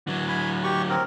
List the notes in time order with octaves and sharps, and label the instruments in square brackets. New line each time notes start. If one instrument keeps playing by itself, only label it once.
[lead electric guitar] D3 F#3
[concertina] G#5 B5
G4 C#6
C4 A#4